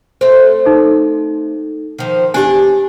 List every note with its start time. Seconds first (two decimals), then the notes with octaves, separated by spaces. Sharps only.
0.21 A3 C4 C5
0.66 D#4 A4
1.98 D#3 F3
2.34 E2 D4 G4 G#4 G#5